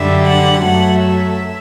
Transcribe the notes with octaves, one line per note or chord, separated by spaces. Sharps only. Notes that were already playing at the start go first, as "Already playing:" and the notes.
Already playing: F#2 D3 G3 E5
F#5
F#2 F#3 A3 F#5
E5